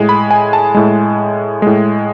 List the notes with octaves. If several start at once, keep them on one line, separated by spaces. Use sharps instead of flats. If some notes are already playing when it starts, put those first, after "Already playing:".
Already playing: A2 G#3
B5
G#5
A5
A2 G#3
A2 G#3